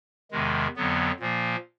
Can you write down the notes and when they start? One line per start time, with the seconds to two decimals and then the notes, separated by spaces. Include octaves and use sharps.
0.31 E2 C3 D#3 G#3
0.76 F2 D3 F#3 B3
1.20 A#2 F3 A#3